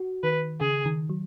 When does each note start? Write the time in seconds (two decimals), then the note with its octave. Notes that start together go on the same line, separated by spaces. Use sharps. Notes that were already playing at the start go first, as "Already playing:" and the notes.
Already playing: F#4
0.23 D#3 B4
0.60 C#3 G#4
0.86 D#3
1.09 F#3